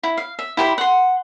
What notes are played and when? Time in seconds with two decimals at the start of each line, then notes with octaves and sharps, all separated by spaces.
0.03 E4
0.17 F5
0.39 E5
0.57 E4 G4 C5 B5
0.78 F#5 C6